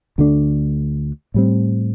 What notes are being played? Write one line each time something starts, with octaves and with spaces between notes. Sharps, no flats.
D2 D3 A3 D4
A2 G3 C4